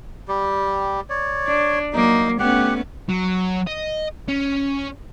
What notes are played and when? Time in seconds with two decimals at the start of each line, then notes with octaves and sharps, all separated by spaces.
0.28 G3 G4
1.10 C#5 D5
1.47 D4
1.93 F#3 A#3 D#4
2.39 A3 B3 C#4 G4 F#5
3.09 F#3
3.67 D#5
4.28 C#4